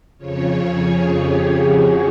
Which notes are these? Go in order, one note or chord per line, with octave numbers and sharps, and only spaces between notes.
F2 C#3 F3 C#5
G#4
G4
F#4